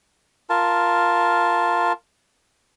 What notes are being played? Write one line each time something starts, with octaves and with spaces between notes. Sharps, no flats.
F4 A#4 A5